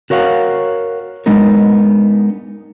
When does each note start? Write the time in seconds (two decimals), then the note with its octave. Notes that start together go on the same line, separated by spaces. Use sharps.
0.10 F#4 A#4 C#5 F5 F#5
1.26 G#3 B3 D4 D#4 A#4